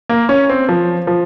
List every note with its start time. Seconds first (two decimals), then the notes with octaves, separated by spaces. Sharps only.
0.09 A#3
0.29 C#4
0.49 C4
0.69 F3
1.07 F3